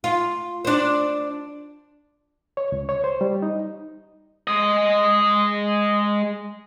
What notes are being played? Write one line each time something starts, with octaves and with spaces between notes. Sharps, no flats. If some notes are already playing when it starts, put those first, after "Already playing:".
F4
D4 C5
C#5
C#2
C#5
C5
G3
D#4
G#3 D#5